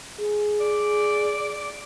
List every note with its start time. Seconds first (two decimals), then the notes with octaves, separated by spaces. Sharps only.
0.19 G#4
0.60 D5